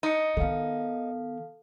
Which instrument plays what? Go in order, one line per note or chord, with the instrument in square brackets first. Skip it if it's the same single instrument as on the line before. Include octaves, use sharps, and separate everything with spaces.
[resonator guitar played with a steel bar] D#4 [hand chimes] D#5 D#6 C#7
[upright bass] D#3 B3 [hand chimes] A4 F5